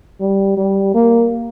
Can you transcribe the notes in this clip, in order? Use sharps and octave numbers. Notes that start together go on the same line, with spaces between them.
G3
G3
A#3